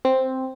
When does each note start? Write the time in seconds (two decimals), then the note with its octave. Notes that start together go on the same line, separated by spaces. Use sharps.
0.05 C4